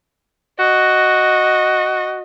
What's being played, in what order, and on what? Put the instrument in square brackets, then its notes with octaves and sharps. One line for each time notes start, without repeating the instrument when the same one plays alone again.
[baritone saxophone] F#4 [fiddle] D#5